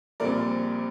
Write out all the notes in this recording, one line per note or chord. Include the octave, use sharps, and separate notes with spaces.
A#1 A#2 G3 C4 A#4 D5